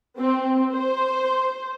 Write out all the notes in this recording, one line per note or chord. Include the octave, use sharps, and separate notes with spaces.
C4
C5